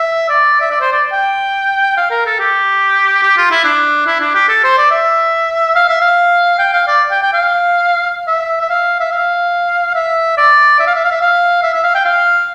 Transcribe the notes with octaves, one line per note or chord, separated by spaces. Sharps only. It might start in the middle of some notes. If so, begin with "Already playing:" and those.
Already playing: E5
D5
E5
D5
C5
D5
G5
F5
A#4
A4
G4
G4
F4
E4
D4
E4
D4
G4
A4
C5
D5
E5
F5
E5
F5
G5
F5
D5
G5
G5
F5
E5
E5
F5
E5
F5
E5
D5
E5
F5
E5
F5
E5
F5
E5
E5
F5
G5
F5